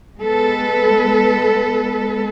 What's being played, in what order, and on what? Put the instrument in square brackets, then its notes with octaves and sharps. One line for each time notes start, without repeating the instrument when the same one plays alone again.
[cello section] G#3 B3 A4 B4